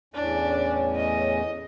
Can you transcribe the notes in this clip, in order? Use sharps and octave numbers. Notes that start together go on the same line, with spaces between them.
E2 A2 C#4 D4
D#5